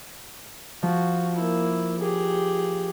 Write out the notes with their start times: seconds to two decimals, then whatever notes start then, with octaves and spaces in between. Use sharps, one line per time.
0.83 F3 F#4
1.36 A#3 E4
1.99 G4 G#4